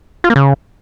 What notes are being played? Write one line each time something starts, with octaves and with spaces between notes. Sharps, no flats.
F4
A#3
C#3